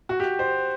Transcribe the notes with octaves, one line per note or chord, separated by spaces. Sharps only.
F#4
G4
C5